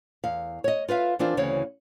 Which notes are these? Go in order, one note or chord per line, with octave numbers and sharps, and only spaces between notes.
E2 F5
C#5 D#5
F4 B4 E5 F5
E3 C4 D4 F4 A#4 C5
D2 C#3 E3 C4 F#4 C#5